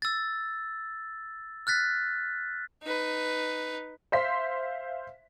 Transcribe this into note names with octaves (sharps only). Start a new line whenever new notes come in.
E6 A6
F6 F#6 A6 B6
D#4 B4
C5 E5 F5 C6 B6